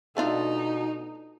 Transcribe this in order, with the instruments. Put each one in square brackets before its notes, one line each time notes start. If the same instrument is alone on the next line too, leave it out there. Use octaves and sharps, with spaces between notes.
[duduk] B2 [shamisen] A3 D4 F4 [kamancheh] D#4